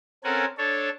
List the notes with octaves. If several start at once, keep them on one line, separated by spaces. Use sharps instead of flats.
C4 C#4 A4 A#4 F#5 G#5
D4 A4 C#5